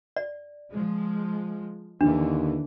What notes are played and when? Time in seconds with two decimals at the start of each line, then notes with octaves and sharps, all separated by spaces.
0.16 D5
0.72 F3 G#3
2.01 D#2 D3 E3 D4